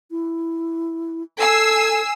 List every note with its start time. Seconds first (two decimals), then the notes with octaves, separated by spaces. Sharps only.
0.11 E4
1.38 A4 G#5 E6 C7